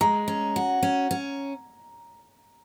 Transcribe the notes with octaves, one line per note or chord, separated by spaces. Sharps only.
G#3 A#5
C#4
F#4
C#4
C#4